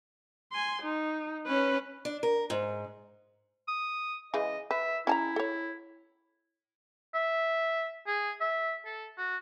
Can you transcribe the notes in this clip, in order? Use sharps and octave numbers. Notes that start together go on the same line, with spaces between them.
G#5 C6
D#4
C#4 B4
D4
A#4
G#2
D#6
C#3 E3 G#3 D#5
B4 E5
C#4 E4 A5 A#5
A4 C#5
E5
G#4
E5
A4
F#4